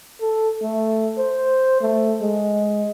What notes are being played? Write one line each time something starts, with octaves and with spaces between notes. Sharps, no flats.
A4
A3
C5
A3
G#3